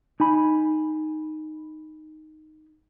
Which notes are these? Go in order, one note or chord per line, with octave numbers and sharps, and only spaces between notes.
D#4 G#5 B5